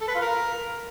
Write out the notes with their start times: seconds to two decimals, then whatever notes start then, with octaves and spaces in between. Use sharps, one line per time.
0.01 A4
0.08 B4
0.15 F4
0.22 A#4